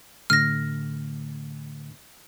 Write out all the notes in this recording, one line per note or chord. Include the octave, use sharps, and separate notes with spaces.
A2 D3 A3 F6 A#6